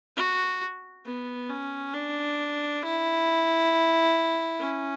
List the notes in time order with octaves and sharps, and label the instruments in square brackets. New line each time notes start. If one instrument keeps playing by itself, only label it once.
[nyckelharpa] F#4
B3
C#4
D4
E4
C#4